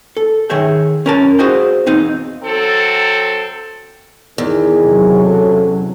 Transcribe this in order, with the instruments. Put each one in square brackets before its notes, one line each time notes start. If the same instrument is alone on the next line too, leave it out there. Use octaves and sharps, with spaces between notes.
[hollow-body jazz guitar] A4
D#3 G#4 C#5 E5 G5
C#4 A#4 A5
F#4 G#4 C5 D#5 F5 G5
E2 C4 D#4 F5
[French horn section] F#3 C4 A4
[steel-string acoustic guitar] E2 [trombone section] D#3 G#4
[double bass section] C3 F#3
[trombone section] C#4 A4